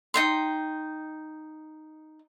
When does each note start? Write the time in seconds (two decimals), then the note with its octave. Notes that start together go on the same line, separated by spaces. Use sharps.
0.14 D#4 G5 C6